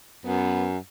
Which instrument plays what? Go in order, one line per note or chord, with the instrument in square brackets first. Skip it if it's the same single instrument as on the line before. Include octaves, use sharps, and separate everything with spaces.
[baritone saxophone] F#2 [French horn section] B3